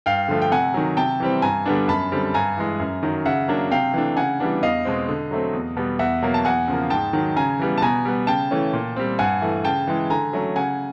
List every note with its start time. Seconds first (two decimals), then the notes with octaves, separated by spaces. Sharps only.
0.06 G2 F5 G5
0.28 D3 F3 A3
0.42 G5
0.51 C3 F#5 G#5
0.74 D#3 F#3
0.97 C3 G5 A5
1.20 E3 G3 C4
1.42 G2 G#5 A#5
1.66 D3 G3 B3 D4
1.88 F#2 A5 B5
2.12 D3 G3 C4
2.34 G2 G#5 A#5
2.58 E3 G#3
2.80 F#2
3.03 D#3 F#3
3.25 C#3 E5 F#5
3.48 F#3 A#3 D4
3.71 C3 F5 G5
3.93 E3 A3 D4
4.17 C#3 F#5 G#5
4.40 E3 G3 B3 D4
4.63 E2 D#5 F5
4.85 B2 G#3 C4
5.08 D3
5.31 F#3 A3 C4
5.53 E2
5.77 B2 G3 B3
5.99 E2 E5 F#5
6.22 B2 F#3 A#3
6.34 A5
6.45 E2 F#5 G#5
6.68 C#3 F3 A#3
6.90 G#2 G5 A5
7.13 D#3 F#3
7.36 C#3 G#5 A#5
7.59 E3 G3 B3
7.78 A5
7.82 B2 G#5 A#5
8.05 G3 B3
8.27 C#3 G5 A5
8.51 E3 A3 C#4
8.74 A#2
8.96 G3 C4
9.19 G2 F#5 G#5
9.42 E3 A3
9.65 C#3 G5 A5
9.88 E3 G#3
10.10 D3 G#5 A#5
10.33 F#3 A3 C#4
10.56 C#3 F#5 G#5